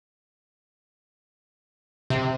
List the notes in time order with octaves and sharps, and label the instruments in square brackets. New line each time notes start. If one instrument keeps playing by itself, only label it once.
[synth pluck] C3